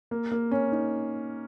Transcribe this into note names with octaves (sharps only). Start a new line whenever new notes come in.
A#3
A#3
C#4
D#4